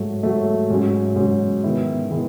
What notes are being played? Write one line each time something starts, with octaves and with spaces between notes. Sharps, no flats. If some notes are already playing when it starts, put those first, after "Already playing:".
Already playing: G#2 F#3 A3
G#2 F#3 A3
G#2 F#3 C#4
G#2 F#3 C#4
D#3 G#3 B3 E4
D#3 G#3 B3 E4